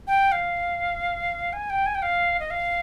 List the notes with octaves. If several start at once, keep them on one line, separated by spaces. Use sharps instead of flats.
G5
F5
G#5
G5
G#5
G5
F5
D#5
F5